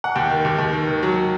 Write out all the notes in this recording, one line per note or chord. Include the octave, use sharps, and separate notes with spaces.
F#5
D#2 G5
D#3
D#2
D#2
D#3
D#3
F#3